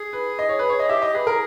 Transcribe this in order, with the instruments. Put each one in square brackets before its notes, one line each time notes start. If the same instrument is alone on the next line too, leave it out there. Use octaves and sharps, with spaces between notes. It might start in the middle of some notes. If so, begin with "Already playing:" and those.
Already playing: [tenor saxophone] G#4
[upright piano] B4
D#5
C#5
B4
C#5
D#5
[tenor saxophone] G4 [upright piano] E5
[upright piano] D#5
[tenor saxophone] G#4 [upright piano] B4
[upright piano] A#4